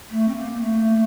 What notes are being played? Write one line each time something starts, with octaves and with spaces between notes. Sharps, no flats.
A3
C4
A#3
A3